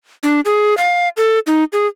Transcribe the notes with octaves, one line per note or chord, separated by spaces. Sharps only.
D4
G#4
F5
A4
D#4
G#4